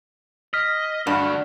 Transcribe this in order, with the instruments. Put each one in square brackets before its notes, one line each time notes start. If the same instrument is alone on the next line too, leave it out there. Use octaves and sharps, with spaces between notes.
[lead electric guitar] D#5 [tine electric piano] F6 B6
[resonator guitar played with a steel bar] G2 [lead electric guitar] D3 F#4